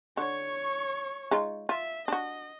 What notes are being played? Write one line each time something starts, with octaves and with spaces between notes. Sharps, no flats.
D3 C#5 C#6
G#3 D#4 F4
F4 E5
D4 F#4 D#5